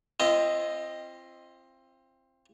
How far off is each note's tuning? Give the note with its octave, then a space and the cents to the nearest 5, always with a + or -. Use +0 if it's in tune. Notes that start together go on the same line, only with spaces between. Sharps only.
C4 +15 F4 -35 D#5 +0